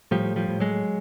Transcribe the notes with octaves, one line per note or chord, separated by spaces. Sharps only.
A2 F3 G3
F3 G3
A2
F#3 G#3